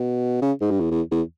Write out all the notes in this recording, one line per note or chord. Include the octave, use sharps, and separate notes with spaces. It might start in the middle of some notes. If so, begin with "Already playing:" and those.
Already playing: B2
C#3
G#2
G2
E2
E2
E2